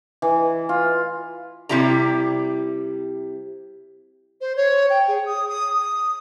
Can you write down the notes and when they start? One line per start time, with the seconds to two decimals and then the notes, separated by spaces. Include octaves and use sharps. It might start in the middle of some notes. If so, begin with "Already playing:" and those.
0.22 E3
0.69 F4
1.69 C3 G3 E4 G4 A#5
4.41 C5
4.56 C#5
4.90 G5
5.08 G#4
5.26 D#6
5.49 D#6
5.80 D#6